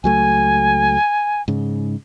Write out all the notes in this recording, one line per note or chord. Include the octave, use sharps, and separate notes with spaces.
C#2 F#3 A3 G#5
G#2 C#3